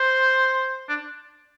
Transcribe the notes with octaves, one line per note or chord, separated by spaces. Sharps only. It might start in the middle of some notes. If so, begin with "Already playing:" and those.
Already playing: C5
D4